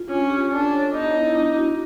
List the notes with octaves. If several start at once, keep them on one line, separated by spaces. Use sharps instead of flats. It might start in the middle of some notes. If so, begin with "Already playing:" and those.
Already playing: F4
C#4 D4
G4
D4 A4
C#5
B3 D#4
E4
D4
F#4